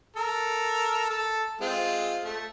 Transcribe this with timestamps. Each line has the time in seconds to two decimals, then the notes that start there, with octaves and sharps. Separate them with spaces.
0.16 A4 A#4
1.10 A4
1.61 G#3 C4 F4
2.23 A3